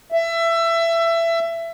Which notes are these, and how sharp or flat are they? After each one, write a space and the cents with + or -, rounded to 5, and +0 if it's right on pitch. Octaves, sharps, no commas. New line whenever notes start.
E5 +20